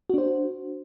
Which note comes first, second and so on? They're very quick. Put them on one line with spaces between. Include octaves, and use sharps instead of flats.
F#4 D4 C5